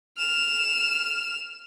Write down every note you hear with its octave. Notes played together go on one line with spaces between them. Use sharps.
F6 E7